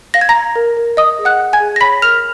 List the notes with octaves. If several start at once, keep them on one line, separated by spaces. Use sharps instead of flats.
F5 A#6
G#6
A#5 A#6
F5
A#4
A#4
D#5 D#6
G#4
F#5 F#6
F#5
G#5 G#6
G#4
A#6
C#5 B5 B6
A#4 F6 F7